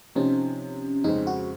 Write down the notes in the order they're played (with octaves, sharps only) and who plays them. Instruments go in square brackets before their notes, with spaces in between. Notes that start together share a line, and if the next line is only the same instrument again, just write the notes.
[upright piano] C3 F3 C4 D#4 [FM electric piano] C#4
[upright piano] F2 C#3 G#3 C4 [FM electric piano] D#4
[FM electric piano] F#4